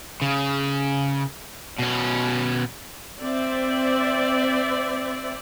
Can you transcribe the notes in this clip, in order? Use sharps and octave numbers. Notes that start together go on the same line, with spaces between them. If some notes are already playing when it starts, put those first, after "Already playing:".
C#3
B2 C#4
C4 C5 D5 E5